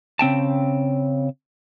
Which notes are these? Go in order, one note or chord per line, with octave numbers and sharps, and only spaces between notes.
C#3 C4 G5 A5